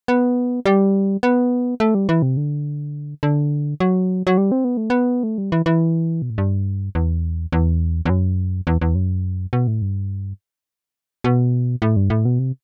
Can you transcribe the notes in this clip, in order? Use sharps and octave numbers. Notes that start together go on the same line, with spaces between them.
B3
G3
B3
A3
G3
E3
C3
D3
D3
F#3
F#3
G3
C4
B3
A3
B3
A3
G3
E3
E3
B2
A2
G2
E2
E2
E2
F#2
E2
E2
F#2
B2
A2
G2
B2
A2
G2
A2
B2
C3